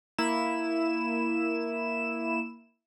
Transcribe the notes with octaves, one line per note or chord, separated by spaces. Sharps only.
A#3 E4 E7